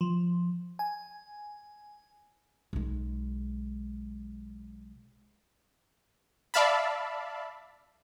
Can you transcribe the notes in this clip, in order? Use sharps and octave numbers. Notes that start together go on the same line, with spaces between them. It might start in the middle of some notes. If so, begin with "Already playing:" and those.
F3
G#5
B1 G#3
D5 E5 F5 A5 B5